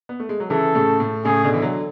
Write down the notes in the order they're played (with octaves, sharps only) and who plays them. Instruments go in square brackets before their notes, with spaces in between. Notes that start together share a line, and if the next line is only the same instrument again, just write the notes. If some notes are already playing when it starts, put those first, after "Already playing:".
[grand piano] B3
A3
G#3
F#3
[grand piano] C#3 E3 [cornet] A4
[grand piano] A2 C#3
A2
[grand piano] A2 C#3 [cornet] G#4
[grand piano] B2 D3
E3
D3 F#3